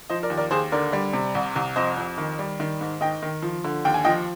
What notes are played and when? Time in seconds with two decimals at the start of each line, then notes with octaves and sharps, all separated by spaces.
0.10 F3 C5 D#5
0.23 A#4 D5
0.30 D#2
0.37 A#4 D5
0.51 D#2 G#4 C5
0.72 D3 A#4 D5
0.93 G3
1.13 C3
1.35 C2
1.56 C2
1.76 F2 C5 D#5
1.97 F2
2.18 D#3
2.39 G3
2.60 D#3
2.81 G#2
3.01 D#3 D#5 G5
3.22 D#3
3.43 F3
3.64 D3
3.85 D#2 G5
3.94 G#5
4.05 F3 D#5 G5